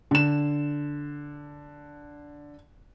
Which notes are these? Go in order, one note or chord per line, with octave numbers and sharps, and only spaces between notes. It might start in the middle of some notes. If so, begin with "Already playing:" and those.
D3 E7